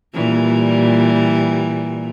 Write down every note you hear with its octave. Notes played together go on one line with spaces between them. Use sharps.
A#2 E3 G3